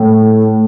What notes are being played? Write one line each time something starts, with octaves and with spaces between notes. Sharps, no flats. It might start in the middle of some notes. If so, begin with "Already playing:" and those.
Already playing: A2